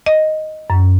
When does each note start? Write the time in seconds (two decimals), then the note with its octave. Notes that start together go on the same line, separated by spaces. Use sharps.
0.06 D#5
0.70 F#2